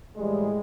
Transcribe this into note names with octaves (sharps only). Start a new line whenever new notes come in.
A2 E3 G3 G#3